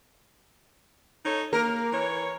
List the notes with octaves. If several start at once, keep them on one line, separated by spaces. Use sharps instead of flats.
D#4 A4 C#5
A#3 A#4
E3 C#5